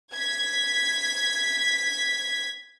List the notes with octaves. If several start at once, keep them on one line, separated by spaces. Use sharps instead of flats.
G#6 B6